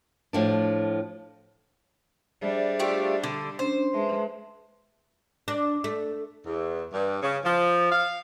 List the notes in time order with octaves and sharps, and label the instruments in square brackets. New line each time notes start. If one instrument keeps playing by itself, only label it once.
[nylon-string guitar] A2 F3 D4
[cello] G3 D4 [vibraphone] G#4 C5 E5
[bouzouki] A3 F4 G4
D3
[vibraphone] C#4 D4 [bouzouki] C5
[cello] G#3 [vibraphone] B4 E5 A5
[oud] D4
A3
[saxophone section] E2
G2
C#3
F3
F5